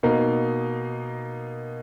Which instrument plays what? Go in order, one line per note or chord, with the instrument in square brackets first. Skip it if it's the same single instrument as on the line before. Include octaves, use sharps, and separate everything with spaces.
[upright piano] B2 A#3 D#4